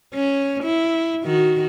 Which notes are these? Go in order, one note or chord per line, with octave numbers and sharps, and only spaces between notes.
C#4
E4
D#3 F#4